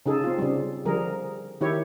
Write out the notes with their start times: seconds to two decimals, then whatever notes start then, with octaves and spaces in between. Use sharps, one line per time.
0.06 C#3 D#4 G#4 A4
0.24 C4 F4
0.38 C#3 G3
0.85 D3 F3 G3 G#4 A#4
1.61 D#3 E4 G4 C#5